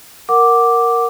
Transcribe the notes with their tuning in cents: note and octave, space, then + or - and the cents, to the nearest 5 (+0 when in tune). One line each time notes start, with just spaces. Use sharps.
A#4 +0 F#5 +0 D6 +0